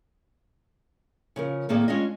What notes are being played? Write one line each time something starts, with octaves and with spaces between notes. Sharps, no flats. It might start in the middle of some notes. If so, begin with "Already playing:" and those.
C#3 F3 A#4
A2 D#3 A#3 C4 G#4 D5
G#3 C#4 D4 F4 D#5